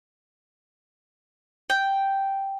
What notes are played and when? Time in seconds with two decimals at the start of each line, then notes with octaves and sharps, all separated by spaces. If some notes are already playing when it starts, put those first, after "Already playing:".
1.70 G5